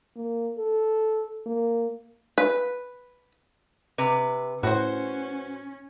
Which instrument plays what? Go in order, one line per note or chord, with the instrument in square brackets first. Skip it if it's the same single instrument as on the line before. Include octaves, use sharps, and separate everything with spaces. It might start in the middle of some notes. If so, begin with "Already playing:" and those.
[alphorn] A#3
A4
A#3
[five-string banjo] B4
[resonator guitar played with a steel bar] C3 B4
[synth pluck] A2 [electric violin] C#4 [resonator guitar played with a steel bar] F#4 C5